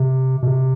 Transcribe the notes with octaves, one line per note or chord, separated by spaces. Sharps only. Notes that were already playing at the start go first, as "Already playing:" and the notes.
Already playing: C3
B2
C3